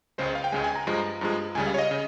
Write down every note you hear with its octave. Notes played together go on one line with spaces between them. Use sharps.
C#2 C#3 G#3 C5
F5
G5
C#2 C#3 G#3 G#5
G#5
A#5
G2 F3 G#3
G2 F3 G#3
C#2 C#3 G3 G#5
F5
C#5
D#5
C#3